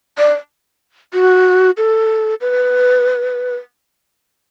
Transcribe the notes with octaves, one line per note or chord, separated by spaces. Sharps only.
D5
F#4
A4
B4